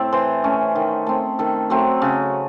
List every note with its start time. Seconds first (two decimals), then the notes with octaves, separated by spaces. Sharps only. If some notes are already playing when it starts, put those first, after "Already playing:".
Already playing: A2 C4 A4
0.12 E3 C5
0.44 A3 C#4
0.75 D#3
1.07 A3 C4
1.39 D#3 A4
1.70 F#3 A3 C4
2.02 C#3